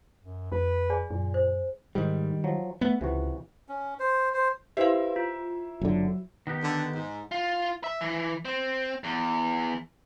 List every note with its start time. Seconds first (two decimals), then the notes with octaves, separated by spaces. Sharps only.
0.21 F#2
0.52 F2 B4
0.90 G#4 D5 G#5
1.10 F#2 A#2
1.34 C5
1.95 G#2 D#3 G3
2.44 F3 F#3
2.81 A3 B3 F#5
3.01 C#2 C3 E3 F#4
3.69 C#4
4.00 C5
4.34 C5
4.77 E4 G4 B4 C5 E5 F5
5.16 F4
5.81 F#1 D3 F#3
6.47 D#3 B3 G4
6.63 D3
6.93 G#2
7.31 F4
7.84 E5
8.01 E3
8.45 C4
9.04 E2